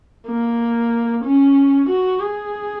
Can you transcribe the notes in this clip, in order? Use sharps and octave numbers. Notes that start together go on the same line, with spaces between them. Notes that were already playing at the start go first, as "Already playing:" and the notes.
A#3
C#4
F#4
G#4